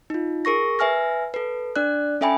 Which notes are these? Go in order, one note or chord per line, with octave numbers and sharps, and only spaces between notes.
D#4 F4
G#4 A#4 C#6 A#6
B4 E5 G#5 F6 A#6
A4 B4
D4 D5 F#6
C#4 A4 E5 G5 G#5 B5